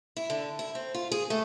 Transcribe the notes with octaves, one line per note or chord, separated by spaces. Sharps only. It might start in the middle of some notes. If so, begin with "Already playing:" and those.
E4
D3
E4
C4
F4
G#4
A3